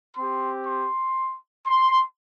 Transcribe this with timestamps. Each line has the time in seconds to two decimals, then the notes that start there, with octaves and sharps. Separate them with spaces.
0.17 C4 G4 C6
0.66 C6
1.67 C6